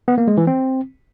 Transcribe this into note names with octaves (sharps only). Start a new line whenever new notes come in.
B3
A#3
G#3
E3
C4